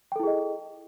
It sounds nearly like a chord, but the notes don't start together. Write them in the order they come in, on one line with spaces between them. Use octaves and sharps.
G5 A4 E4 G#4 D#5